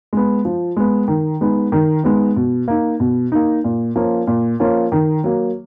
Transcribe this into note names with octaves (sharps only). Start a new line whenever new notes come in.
G#3 B3
F3
G#3 B3
D#3
G#3 B3 D#4
D#3
G#3 B3 D#4
B2
A#3 D#4
B2
A#3 D#4
A#2
F3 A#3 C#4 F4
A#2
F3 A#3 C#4 F4
D#3
F#3 A#3